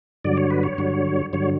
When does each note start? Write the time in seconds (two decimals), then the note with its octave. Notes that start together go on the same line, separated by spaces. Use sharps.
0.24 G2 D3 F#3 D5
0.37 C#5
0.50 B4
0.63 C#5
0.78 G2 D3 F#3
1.33 G2 D3 F#3 C#5